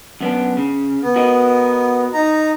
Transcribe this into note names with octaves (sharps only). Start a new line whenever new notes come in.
F#2 B3 D4
C#3
B3
F#4 A#4 D#5
D#4 A#5